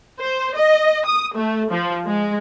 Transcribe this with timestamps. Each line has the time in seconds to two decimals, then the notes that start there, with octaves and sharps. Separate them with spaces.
0.20 C5
0.56 D#5
1.06 D#6
1.37 A3
1.72 F3
2.06 G#3